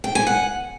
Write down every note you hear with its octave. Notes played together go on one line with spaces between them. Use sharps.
G5
G#5
F#5